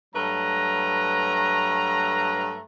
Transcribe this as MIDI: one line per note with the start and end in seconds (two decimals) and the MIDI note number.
0.15 2.61 43
0.15 2.61 54
0.15 2.61 57
0.15 2.61 71
0.15 2.61 82